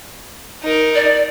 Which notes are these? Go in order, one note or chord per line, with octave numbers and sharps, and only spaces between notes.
D#4 A#4
D5